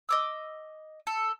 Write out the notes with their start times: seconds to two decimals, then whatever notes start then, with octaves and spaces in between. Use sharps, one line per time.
0.09 D#5 D6 E6
1.07 A4